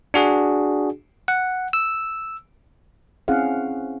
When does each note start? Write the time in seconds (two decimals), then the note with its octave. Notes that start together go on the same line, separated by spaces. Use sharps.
0.14 D4 F#4 G#4
1.28 F#5
1.73 E6
3.28 C4 C#4 E4 G#4 F5 F#5